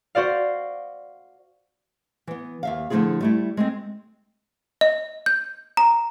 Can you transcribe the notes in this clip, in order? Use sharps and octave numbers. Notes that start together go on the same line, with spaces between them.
F#4 C5 D5 F5
E3 B3
D#2 E5 F5
D3 F3 A3 E4 F4 G#4
G3 A3 E4
G#3 A3 C4
D#5
G6
A#5